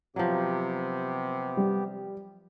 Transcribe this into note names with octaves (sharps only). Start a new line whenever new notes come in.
C3 F3 F#3 B3 G4
G3